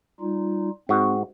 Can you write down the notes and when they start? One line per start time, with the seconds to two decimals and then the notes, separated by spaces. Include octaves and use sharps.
0.20 G3 D#4 F4
0.89 G#2 C4 F#4